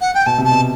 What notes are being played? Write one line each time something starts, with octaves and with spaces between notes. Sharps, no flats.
F#5
G5
B2 A5
C3
A5
B2